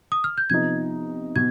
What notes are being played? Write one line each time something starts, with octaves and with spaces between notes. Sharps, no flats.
D#6
F6
G6
C3 F3 B3 D#4 G#6
B2 G#6